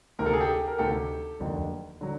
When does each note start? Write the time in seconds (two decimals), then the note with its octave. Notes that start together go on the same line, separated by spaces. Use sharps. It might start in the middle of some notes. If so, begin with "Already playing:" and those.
0.19 D2 C3 D#3 A#4
0.26 A4
0.33 G#4
0.40 G4 A4
0.67 A#4
0.78 D2 C3 D#3 G4 A4
1.40 F1 D#2 D3 F#3
2.01 D3 F#3